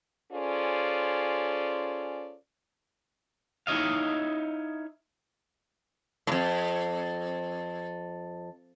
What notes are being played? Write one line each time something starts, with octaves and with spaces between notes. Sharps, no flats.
C#4 F4 G#4 A4 C5 D5
D#4 E4 C#5 D#5 F5
F2 A2